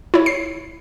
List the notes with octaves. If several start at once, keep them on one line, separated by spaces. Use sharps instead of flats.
E4 C#5
C7